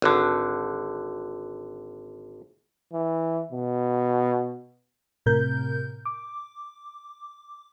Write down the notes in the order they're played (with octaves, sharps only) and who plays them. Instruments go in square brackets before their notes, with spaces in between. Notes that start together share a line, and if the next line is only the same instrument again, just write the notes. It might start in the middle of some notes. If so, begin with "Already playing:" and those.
[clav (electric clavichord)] G#1 D3
[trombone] E3
B2
[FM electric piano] A2 C3 A#4 G6
D6